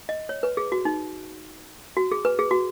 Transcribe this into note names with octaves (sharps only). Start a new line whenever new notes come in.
D#5
C#5
B4
G#4
F#4
D#4
F#4
G#4
B4
G#4
F#4